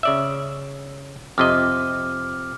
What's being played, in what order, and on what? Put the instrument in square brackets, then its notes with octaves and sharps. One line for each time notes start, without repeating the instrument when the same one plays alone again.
[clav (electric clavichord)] C#3 D5 E5
[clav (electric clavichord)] F2 C3 D#5 [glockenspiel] D6 F6